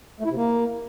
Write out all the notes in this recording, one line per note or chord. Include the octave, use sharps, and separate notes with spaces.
A3
E4
C3
A#3